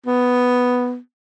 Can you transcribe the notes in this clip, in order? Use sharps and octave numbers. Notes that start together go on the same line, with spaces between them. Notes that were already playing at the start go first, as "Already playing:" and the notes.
B3